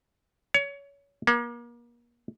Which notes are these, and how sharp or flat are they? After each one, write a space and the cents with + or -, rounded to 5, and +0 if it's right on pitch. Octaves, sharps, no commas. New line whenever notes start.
C#5 +25
A#3 +35